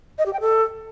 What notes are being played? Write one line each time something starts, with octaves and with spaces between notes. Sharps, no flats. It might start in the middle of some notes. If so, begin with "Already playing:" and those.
D#5
G4
G5
A4